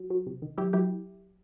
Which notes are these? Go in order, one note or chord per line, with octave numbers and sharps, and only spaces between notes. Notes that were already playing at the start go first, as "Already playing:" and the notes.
Already playing: F#3
F#3
C3
D#3
F#3 E4 G4
F#3 E4 G4